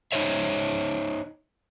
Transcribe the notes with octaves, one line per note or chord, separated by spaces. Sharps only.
D#4 F#4 C5 C#5 E5